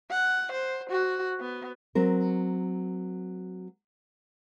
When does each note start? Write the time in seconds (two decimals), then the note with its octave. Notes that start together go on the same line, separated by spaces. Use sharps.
0.11 F#5
0.52 C5
0.90 F#4
1.40 B3
1.95 F#3 C4 A#4